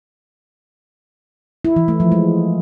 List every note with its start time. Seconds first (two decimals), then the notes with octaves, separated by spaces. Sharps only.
1.65 E4
1.76 E3
1.88 A3
2.00 F3
2.12 G#3